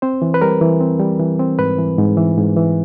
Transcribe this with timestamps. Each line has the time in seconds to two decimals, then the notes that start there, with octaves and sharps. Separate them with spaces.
0.02 C4 C5
0.22 E3
0.34 B4
0.42 G3 A#4
0.61 E3
0.81 C4
1.00 G3
1.20 E3
1.40 C4
1.59 G#2 B4
1.78 E3
1.98 G#2
2.17 E3
2.37 G#2
2.56 E3